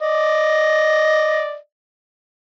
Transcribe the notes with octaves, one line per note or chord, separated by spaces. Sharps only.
D5 D#5